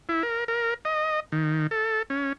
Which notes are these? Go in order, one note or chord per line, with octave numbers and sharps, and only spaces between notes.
E4
A#4
A#4
D#5
D#3
A4
C#4